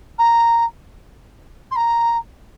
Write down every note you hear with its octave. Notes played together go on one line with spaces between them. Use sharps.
A#5
C6
A#5